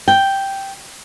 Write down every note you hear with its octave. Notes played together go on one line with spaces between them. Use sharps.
G5